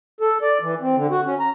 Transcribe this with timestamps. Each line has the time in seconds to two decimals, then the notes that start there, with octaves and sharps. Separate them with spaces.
0.21 A4
0.42 D5
0.62 E3
0.81 C4
0.96 D3
1.11 F#4
1.26 C#4
1.40 A#5